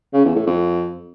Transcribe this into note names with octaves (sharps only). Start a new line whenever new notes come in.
C#3
E2
A2
F2